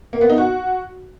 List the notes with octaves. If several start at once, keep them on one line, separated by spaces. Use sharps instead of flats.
A#3
B3
D#4
F#4